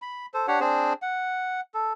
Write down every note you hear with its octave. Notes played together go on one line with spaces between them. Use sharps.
B5
A4 C5
D4 G4 C#5 F#5
C4 D4 G#4 C5
F#5
A4